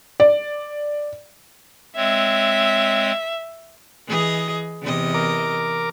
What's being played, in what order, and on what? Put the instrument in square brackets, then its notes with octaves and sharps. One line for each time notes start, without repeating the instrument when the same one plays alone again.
[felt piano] D5
[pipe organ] G#3 C4 C#5 [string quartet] E5
[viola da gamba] E3 G#4 D#5
E2 C3 D#5
[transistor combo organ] A#4 D6